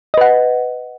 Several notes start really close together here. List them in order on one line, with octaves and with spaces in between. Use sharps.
D#5 B4 F#5